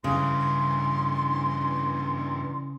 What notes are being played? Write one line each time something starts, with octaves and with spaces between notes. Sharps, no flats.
G2 C#3 E3 C6